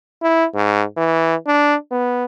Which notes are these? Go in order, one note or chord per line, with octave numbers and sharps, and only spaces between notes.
E4
G#2
E3
D4
B3